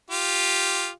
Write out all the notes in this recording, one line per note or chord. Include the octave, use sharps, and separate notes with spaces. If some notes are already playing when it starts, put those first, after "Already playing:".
F4 G4